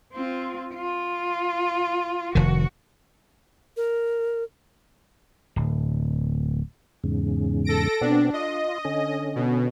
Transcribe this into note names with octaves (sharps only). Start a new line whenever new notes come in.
C4 F4
F4
F1 D#3 F#4
A#4
D1
E2 G#2 C#3
A4 A#6 D7
B2 B3 C4 D4
F4 D#5
D3 C#4
B2